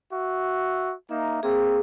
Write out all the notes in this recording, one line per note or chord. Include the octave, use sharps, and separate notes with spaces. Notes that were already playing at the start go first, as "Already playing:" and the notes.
F#4 E5
A#3 D#4 E5
A#3 C4 G#4